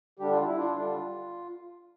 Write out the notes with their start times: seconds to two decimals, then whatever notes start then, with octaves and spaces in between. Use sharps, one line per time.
0.19 D3 G3 D4 G4
0.32 F4
0.44 E4
0.56 D4 F4
0.75 D3 G3 D4